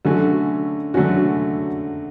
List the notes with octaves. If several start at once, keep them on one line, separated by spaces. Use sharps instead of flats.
D3 F#3 A3 C#4 F#4
D3 F#3 A3 C#4 F#4